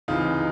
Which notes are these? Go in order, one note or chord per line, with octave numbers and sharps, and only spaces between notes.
C#2 C3 E3 D#4 F4